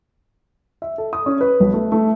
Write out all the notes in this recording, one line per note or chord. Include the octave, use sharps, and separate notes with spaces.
E5
A4
D#6
C#4
B4
B1
A3
A3